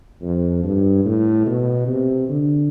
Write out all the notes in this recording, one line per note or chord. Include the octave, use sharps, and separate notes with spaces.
F2
G2
A2
B2
C3
D3